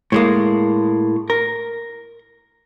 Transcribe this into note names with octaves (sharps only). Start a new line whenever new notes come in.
A2 G#3 A#3
A#4